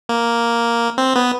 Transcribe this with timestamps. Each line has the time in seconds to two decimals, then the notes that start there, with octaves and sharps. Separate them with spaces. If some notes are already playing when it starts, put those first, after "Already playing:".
0.09 A#3
0.98 C4
1.16 B3